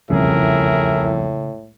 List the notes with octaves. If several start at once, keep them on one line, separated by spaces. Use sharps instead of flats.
E1 C2 F2 A2 C#3 G#4 A#4 E5